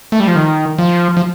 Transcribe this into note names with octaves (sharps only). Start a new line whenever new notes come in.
A3
G3
F3
D#3
F3
F3